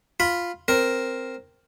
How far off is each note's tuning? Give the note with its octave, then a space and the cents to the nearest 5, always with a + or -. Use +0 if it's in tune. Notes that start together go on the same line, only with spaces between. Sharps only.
F4 +0 B5 +0
C4 +0 A#4 +0